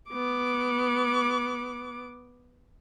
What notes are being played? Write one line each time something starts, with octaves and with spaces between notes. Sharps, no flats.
B3 D6